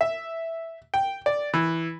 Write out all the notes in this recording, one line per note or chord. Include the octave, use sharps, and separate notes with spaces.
E5
G5
D5
E3